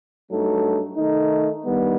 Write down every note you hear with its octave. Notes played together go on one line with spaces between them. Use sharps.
G2 F#3 A3 D#4 A4
D#3 A3 D#4
G2 D#3 G3 B3